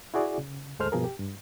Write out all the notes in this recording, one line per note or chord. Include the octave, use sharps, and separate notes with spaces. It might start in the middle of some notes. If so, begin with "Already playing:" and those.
E4 F#4 G#4 D5
C#3
D2 G#2 G#3 A4 C5 F6
G2 B2 F3 G#4 A#4
G4
G2